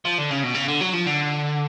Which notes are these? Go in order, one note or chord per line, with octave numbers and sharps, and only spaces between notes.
F3
D3
C#3
B2
C#3
D3
F#3
F3
D3